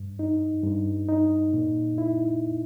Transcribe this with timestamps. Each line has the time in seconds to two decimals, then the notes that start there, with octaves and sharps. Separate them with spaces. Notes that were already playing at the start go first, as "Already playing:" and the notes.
Already playing: G2
0.19 D#4
0.64 G2
1.09 D#4
1.53 A#2
1.98 E4